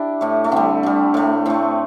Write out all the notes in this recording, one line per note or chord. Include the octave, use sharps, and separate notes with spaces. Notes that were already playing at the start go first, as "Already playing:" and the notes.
Already playing: D4 E4 G4
A2 A3
A3
D3 G3 C4
D3 G3
A2 A3
A2 A3 C4